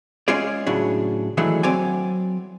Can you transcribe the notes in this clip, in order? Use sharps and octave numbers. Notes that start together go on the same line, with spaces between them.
G#3 C#4 F4 G#4 D5
A2 C#3 F#3 D4
D#3 E3 F#3 G#3 A3 D4
F#3 C4 D5 G#5